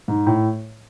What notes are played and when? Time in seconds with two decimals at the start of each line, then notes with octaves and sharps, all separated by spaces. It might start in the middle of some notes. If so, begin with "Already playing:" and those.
0.08 G#2
0.26 A2